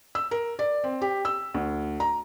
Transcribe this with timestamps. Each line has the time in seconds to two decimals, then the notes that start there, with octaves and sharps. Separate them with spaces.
0.15 E6
0.31 A#4
0.59 D5
0.84 C4
1.02 G4
1.25 E6
1.54 D2
2.00 A#5